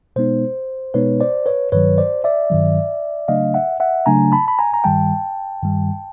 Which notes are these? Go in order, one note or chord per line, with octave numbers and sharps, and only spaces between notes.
B2 G#3 B3 D#4 C5
B2 G#3 B3 D#4 B4 C#5
C5 D5
B4 C#5
G2 D#3 F#3 B4 C#5
C5 D5
D5 E5
G2 D#3 F#3
C#3 F#3 A3 D4 D#5 F5
E5 F#5
E5 F#5
C#3 F#3 A3 D4 G#5 A#5
A5 B5
B5
G#5 A#5
A#5
G2 D#3 G3 G5 A5
G2 D#3 G3